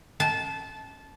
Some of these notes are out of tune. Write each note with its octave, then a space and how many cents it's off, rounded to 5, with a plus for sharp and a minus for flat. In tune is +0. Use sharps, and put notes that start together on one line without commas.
A5 -20